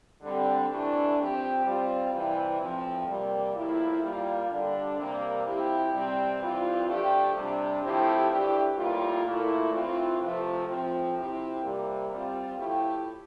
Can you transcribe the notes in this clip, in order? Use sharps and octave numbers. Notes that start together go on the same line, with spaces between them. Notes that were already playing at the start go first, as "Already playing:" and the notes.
D3 G3 C4
C3 E3 A3 D4
F3 C4 G4
G3 C4 F4
C3 E3 G3
A2 F3 C4
C3 G3 A#3
A2 F3 A#3 E4
G3 A#3 F4
D3 G3 D4
C3 G3 A#3
F3 C4 E4 G4
C3 G3 C4
E3 G3 C4 F4
F3 A3 D4 G4
C3 G3 D4
A2 F3 C4 E4 G4
E3 A3 D4 G4
A2 G3 A#3 F4
A#2 A3 E4
E3 A3 C4 F4
C3 F3 A3
A2 F3 C4
C3 F3 C4 E4 G4
C3 G3 A#3
G3 C4 F4
A2 F3 A3 E4 G4